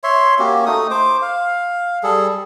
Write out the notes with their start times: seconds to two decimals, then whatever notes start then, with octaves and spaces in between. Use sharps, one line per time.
0.04 C#5 E5 C6
0.39 A#3 C#4 F#4 G4
0.66 A3 D#4 D#6
0.91 C5 D6
1.22 F5
2.03 G3 G#4 A4